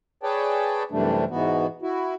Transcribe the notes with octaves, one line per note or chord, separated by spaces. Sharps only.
G#4 B4 C#5 D5 G5 A5
F#2 C3 E3 G3 A3 D4
G#2 B2 E3 B3 F#4
E4 F#4